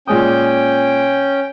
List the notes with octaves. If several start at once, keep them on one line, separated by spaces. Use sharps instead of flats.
A#2 G#3 C#4 G5 D#6